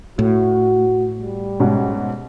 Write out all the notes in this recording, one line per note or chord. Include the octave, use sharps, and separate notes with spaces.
A2 F#4
G3
G#2 B2 C#4